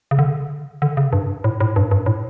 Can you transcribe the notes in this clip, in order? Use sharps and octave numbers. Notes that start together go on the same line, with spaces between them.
C#3
D3
D3
C#3
G2
A2
A2
G2
G2
A2